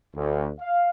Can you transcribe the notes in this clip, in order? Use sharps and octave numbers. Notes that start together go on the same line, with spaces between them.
D2
F5